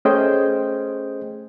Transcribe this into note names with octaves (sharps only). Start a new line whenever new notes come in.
A3 C#4 G#4 C5 D#5 G5